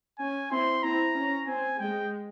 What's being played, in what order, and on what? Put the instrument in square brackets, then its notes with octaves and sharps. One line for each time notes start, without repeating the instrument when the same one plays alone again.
[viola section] C#4 [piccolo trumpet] G#5
[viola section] C4 E4 [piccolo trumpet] C6
[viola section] C4 E4 [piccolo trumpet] A#5
[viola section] C#4
[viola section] C4 [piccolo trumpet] G#5
[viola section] G#3 [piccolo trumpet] G5